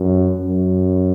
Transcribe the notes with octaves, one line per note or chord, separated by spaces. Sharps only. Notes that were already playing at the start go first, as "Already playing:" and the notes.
Already playing: F#2
F#2